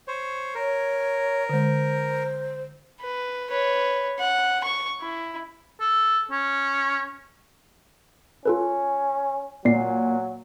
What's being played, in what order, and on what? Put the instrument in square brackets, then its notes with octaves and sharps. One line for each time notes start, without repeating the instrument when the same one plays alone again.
[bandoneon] C5 C#5
[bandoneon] A#4 [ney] C#5
[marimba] D3 G#3 [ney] C5
[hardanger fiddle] B4
B4 C#5
F#5
C#6
E4
[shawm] A4
C#4
[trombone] C#4 [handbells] F4 A4 B4
[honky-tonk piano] A#2 [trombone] F#3 [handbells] D5 C7